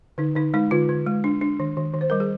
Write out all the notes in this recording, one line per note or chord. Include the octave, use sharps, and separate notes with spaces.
D3 D#4
D3 D#4
G#3 D#4
D3 F4
D3
G#3
D4
D4
D#3
D#3
D#3
C5
G3 A#4
G#4